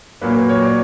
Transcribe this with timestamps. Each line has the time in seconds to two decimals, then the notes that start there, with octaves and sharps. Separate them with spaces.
0.21 A#2 F#3 A#3 B4
0.35 A#4
0.49 C#5
0.63 D5